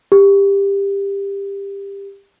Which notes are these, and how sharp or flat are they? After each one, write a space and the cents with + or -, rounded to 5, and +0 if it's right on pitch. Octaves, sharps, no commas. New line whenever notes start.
G4 +20